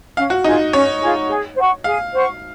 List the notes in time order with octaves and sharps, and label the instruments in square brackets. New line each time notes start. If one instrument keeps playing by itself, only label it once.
[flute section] C#4 [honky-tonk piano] F5
[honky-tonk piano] F#4
[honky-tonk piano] D#4 [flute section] F4 G#4
[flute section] C#4 [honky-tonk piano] C#5
[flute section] F4 G#4
G#4
C5 F#5 C#6
[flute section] G#4 [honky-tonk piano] F5
[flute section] C5 F#5 C#6